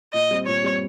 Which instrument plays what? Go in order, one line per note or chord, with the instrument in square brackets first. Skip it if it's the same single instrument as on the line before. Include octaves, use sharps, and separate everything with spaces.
[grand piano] A#2 [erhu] D#5
[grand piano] G3 C4
[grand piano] A#2 [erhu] C#5
[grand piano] G3 C4